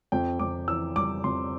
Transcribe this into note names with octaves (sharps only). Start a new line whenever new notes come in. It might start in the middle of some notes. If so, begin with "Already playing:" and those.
F2 G5
F2 D6
E3 E6
G3 D6
F2 C6